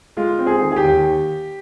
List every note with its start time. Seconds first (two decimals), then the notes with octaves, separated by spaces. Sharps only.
0.17 G#3 F4
0.39 C4
0.47 G#4
0.61 D#3
0.72 G#4
0.76 G4
0.84 D#2